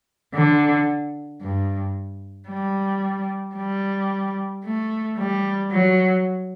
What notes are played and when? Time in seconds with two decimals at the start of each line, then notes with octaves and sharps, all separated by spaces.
0.34 D3
1.40 G2
2.48 G3
3.56 G3
4.64 A3
5.17 G3
5.71 F#3